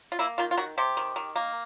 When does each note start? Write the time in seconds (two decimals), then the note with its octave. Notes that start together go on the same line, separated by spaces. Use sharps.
0.12 F4
0.19 A#3 E4
0.38 D#3 F4
0.51 F4
0.57 D#3 F#4
0.78 C3 G4
0.97 D#3
1.16 D#3
1.36 A#3